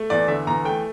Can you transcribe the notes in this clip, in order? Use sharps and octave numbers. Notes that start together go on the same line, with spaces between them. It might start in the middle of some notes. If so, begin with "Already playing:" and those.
Already playing: A3
E2 D5
D3 E5
E2 A#5
A3 G5